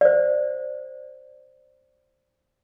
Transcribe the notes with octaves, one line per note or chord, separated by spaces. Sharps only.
C5 D5